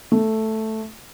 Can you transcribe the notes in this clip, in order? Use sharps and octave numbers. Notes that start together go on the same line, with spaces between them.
A3